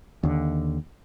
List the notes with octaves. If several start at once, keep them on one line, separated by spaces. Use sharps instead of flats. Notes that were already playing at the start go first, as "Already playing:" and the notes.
D#2 D3